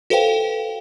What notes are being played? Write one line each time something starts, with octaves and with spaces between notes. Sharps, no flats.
F#4 A4 B4 C5 F5 G5